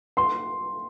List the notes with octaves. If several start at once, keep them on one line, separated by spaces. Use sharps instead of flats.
C6